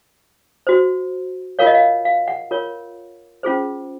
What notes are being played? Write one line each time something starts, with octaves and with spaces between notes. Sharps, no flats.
F#4 C5
F4 A#4 C#5 F5
D#5
F5
F5
F#5
F4 A#4 C#5
C#4 F4 G#4 C5